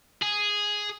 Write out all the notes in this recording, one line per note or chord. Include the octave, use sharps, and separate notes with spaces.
G#4